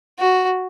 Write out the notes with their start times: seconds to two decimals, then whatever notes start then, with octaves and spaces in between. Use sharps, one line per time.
0.19 F#4